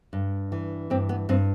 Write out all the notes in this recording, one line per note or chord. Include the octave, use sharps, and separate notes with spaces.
G2
E3
G2 C4
B3
G2 C4